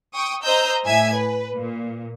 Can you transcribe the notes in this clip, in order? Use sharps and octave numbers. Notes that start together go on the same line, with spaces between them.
G5 C#6 D#6
C5 D#5 A#5 E6 G6
A2 E5 G#5 G#6
B4
A#2